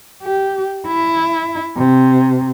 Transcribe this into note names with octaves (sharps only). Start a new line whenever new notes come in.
G4
E4
C3